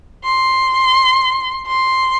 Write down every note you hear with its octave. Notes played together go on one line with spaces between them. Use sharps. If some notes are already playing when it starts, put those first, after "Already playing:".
C6
C6